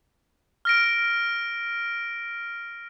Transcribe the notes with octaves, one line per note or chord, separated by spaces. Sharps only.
F6 A#6 D7